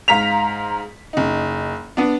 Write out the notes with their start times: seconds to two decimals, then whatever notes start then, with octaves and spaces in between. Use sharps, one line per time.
0.08 G#2 F5 A#5 B6 F7
1.13 F#1 D#4
1.97 B3 D4